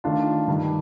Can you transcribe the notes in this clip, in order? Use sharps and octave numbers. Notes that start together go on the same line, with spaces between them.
D#3 A3 D4 F4
G2 D#3 G3